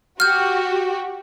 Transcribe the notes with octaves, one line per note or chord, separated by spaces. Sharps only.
F#4 G4 F6 G6